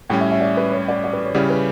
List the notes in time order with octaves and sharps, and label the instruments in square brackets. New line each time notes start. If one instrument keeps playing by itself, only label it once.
[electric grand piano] A2 G3 C#4 [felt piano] G5
[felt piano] E5
E5
D5
B4
C#5
D5
D5
B4
C#5
[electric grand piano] C#3 G3 C#4 E4 G4 [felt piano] D5
[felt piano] B4